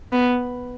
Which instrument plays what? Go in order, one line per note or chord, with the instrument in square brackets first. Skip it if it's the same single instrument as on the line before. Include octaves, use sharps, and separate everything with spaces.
[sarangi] B3